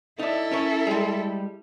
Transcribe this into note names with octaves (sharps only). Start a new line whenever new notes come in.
D#4 E4 A4 D5
C#4 A#4 C#5
G3 G#3